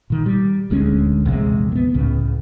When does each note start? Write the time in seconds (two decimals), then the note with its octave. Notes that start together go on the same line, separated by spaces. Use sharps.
0.10 A#2 D#3
0.26 G3
0.70 D#1 D2 G#3 C#4
1.25 A#1 E2 C3 G#3
1.72 A3 B3
1.94 C#2 A2 C#3